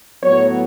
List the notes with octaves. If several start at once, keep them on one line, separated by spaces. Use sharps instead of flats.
A2 F#3 B3 C#5